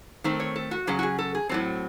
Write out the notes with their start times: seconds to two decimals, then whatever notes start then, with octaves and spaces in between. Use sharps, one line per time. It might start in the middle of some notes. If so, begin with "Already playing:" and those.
0.24 D#3 A3 C4
0.40 C#5
0.56 A4
0.71 F#4
0.87 C#3 F#3 C#4 G#4
0.99 F#4
1.03 G#4
1.18 A4
1.35 G#4
1.49 A2 F#3 C4 A4